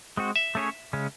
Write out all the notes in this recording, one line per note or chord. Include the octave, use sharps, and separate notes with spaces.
G#3 C4 F#4
E5
A3 C#4 G#4 C#5
C#3 G#3 C#4